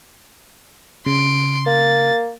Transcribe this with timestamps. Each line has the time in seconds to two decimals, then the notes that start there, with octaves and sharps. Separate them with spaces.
1.06 C#3 C6 D7
1.66 A#3 A6